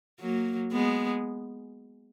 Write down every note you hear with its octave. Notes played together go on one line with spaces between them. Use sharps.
F#3 A#3
G#3 B3